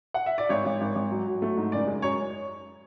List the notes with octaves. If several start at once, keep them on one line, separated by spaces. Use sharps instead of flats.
F#5
E5
D5
G#1 C#5
G#1
G#1
G#1
F#3
F#3
A3
G#2
F#1 D5
G#3
F#2 C#5